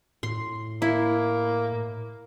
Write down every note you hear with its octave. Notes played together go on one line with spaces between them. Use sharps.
A2 C6
A#3 E4